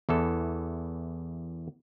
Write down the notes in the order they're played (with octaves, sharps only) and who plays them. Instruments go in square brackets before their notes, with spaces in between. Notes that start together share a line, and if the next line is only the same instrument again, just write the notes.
[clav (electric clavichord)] E2 E3 A4